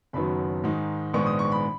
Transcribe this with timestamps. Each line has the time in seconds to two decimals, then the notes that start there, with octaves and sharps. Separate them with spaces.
0.13 F#1 F#2 D#3 F#3 B3 B5
0.64 G#2 D#3 G#3 D#4
1.13 A#1 G#2 D#3 G#3 B3 C#6
1.26 D#6
1.39 C#6
1.52 B5